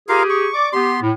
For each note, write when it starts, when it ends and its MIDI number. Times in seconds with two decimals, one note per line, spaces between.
0.09 0.23 65
0.09 0.47 67
0.09 0.47 68
0.09 0.23 70
0.09 0.23 77
0.09 0.47 87
0.30 0.69 85
0.53 0.68 74
0.53 0.68 86
0.73 0.97 59
0.73 0.97 67
0.73 1.00 84
1.02 1.10 45